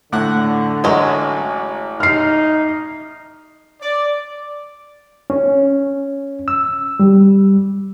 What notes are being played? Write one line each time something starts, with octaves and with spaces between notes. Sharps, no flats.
A2 D3 F#5 F#6
A1 F#3 G#3
D#4 F6 C7
D5
C#4
E6
G3